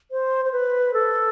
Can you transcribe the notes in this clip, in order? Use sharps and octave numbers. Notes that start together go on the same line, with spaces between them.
C5
C5
B4
A4